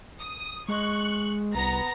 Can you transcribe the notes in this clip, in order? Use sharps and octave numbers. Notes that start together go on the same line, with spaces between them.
D#6
G#3 C#6 F#6
C2 B3 A#5 A#6